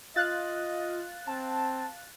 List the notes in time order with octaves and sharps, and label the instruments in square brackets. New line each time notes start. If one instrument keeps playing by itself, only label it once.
[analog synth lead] F4 [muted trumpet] D#5 [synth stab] F5 F#6 A6
[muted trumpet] C4 [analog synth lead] A5